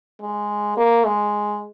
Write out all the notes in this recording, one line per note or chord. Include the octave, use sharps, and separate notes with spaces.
G#3
A#3
G#3